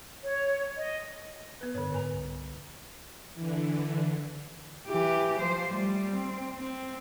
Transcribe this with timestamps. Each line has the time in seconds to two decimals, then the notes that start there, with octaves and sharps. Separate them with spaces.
0.24 C#5
0.76 D#5
1.61 B3 B4
1.75 G2 D3 C#5
1.92 G#2 B4 G#5 A#5
2.14 C2
3.34 D3 E3
4.87 E3 G4
5.40 F3 C5
5.70 G3 A3
6.10 C4
6.57 C4